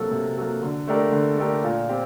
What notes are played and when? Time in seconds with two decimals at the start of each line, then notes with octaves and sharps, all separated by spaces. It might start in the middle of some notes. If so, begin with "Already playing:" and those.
Already playing: C3 F#3 A#3 F#4 A4
0.11 C3
0.36 F#3 A#3 F#4 A4
0.62 D3
0.87 A3 D4 G4 A#4
1.12 D3
1.37 A3 D4 G4 A#4
1.64 A#2
1.88 C4 G4